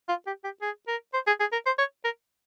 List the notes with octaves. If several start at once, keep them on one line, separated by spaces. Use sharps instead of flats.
F4
G4
G4
G#4
A#4
C5
G#4
G#4
A#4
C5
C#5
A#4